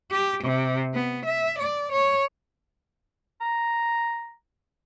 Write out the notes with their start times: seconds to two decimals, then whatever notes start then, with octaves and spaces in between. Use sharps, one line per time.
0.11 G4
0.44 C3
0.94 B3
1.25 E5
1.59 D5
1.92 C#5
3.41 A#5